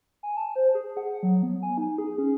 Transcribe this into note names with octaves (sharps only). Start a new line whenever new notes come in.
G#5
A5
C5
G#4
F#5
F#3
B3
G#5
D#4
G#4
C#4